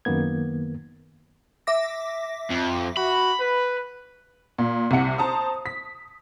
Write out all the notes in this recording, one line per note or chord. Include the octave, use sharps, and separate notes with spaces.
F#2 D#3 A#3 B3 G#6
E5 D6 A#6
F2
F#4 B5
B4
A#2
C2 C3 F#5 C#7
C5 A5 A#5 D#6
B6